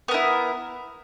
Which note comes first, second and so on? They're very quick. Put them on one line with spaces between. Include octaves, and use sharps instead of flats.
B3 A#4 E4